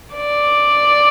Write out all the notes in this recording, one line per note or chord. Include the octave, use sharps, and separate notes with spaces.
D5